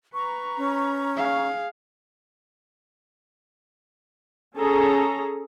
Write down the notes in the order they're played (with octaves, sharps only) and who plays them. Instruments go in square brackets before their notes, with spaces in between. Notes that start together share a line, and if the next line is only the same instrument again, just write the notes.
[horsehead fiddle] B4 [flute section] A#5 C#6
[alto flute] C#4
[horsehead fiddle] G#4 F5
[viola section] C#4 G#4 A4 A#5